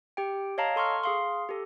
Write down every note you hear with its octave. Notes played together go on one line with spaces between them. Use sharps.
G4 G5
C#5 D#5 F5 A5 A#5
A4 C6 C#6 F6
G#4 F5 C6
G4 A4